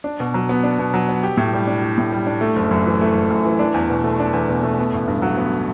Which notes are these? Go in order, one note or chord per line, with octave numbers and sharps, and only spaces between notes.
D4
B2
F#3
B3
D4
B2
F#3
B3
G4
A2
G3
D4
G4
A2
G3
D4
A3
F#1
F#2
E3
A3
F#1
F#2
E3
D4
E2
B2
A3
D4
E2
B2
A3
B3
A1
G2
F#3
B3